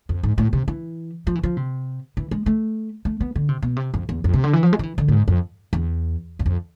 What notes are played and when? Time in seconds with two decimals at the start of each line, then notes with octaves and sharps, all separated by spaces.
0.09 F2
0.23 G#2
0.38 A2
0.53 C3
0.68 E3
1.27 F3
1.35 E3
1.43 F3
1.57 C3
2.17 E3
2.31 G#3
2.46 A3
3.05 A3
3.21 B3
3.36 D3
3.49 C3
3.62 B2
3.76 C3
3.94 F2
4.09 E2
4.24 F2
4.34 C3
4.44 D3
4.53 E3
4.63 F3
4.73 G#3
4.79 F3
4.83 E3
4.98 D3
5.08 A2
5.13 G#2
5.28 F2
5.73 E2
6.39 E2
6.46 F2